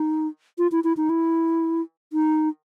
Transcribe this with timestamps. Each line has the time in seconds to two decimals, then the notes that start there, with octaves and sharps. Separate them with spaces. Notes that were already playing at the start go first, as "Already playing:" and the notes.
Already playing: D#4
0.58 F4
0.72 E4
0.84 E4
0.97 D#4
1.10 E4
2.13 D#4